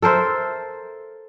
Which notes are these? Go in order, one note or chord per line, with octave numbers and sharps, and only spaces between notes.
A4 A#4 C5 E5